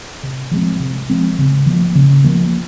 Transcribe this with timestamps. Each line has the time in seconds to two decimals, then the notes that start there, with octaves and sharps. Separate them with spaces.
0.23 C3
0.51 F3 G#3 C4
0.80 C3
1.10 F3 G#3 C4
1.38 C#3
1.66 F3 A#3
1.95 C#3
2.24 F3 A#3